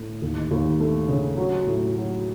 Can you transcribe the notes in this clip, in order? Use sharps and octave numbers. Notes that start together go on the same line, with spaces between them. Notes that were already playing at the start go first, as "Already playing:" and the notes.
Already playing: A2
D#2
D#2
A3
C#3
F#3
A2
F#3